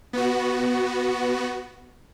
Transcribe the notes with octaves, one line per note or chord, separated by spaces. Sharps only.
B3 F#4